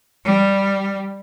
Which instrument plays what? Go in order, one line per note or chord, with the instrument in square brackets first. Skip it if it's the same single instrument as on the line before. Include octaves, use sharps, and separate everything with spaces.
[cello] G3